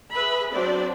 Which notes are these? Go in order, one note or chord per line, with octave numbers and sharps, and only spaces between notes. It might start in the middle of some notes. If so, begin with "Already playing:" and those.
G#4 B4 E5 B5
F#3 C4 D4 C5 D5